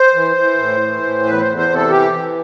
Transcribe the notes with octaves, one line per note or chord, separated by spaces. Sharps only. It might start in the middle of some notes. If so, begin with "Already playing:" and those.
Already playing: C5
E3
E3
A2
E3
A2
E2 B4
C5
E2
C5
C3
A4
E3 G4
E3